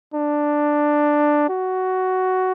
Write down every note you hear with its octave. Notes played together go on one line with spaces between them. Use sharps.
D4
F#4